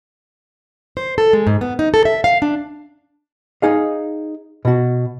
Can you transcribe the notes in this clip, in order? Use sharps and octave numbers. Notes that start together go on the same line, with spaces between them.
C5
A4
G#3
G#2
B3
D#4
A4
E5
F5
D4
D#4 G#4 D#5 F5
B2 F#4